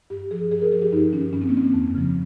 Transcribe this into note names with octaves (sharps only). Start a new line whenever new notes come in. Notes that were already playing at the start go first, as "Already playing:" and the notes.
G2 G4
F3 G#4
G2 G#4
A#4
F3 G#4
G4
G2 D#4
D#3 C#4
G2 C#4
C4
A#3
D#3 C4
F2
C#3 F3